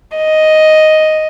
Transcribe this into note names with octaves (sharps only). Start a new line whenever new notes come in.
D#5